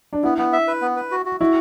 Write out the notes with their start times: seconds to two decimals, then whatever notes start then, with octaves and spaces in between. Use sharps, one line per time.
0.13 D4
0.23 B3 E4
0.38 B3
0.53 E5
0.67 B4
0.81 B3
0.96 B4
1.11 F#4
1.26 F#4
1.40 E4 F#4